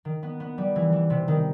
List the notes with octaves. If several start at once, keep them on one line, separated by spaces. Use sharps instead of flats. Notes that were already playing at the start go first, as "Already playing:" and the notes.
D#3
B3
B3
G3
E3
E3
C3
D#3